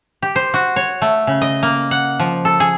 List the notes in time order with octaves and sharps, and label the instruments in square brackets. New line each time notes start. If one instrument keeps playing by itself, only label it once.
[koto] G4
C5
F#4
C#5
A3
C#3
D#5
A#3
F#5
F3
A4
G#4